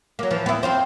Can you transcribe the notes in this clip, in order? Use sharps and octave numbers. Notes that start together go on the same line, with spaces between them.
F#3 A#3
E3 F3
B3 E4
C4 F4 C5